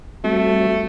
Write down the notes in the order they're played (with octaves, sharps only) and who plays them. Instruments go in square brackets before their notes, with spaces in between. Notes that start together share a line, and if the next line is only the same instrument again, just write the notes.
[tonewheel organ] G3 C4 F#4 [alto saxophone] A3